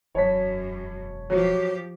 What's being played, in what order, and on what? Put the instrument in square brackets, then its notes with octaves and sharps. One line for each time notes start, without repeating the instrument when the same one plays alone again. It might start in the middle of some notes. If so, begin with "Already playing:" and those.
[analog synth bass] E1 [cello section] F#2 [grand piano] C#5 A5 B6
[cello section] F3 G4 [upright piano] F#3